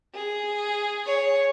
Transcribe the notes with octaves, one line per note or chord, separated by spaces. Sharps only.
G#4
C#5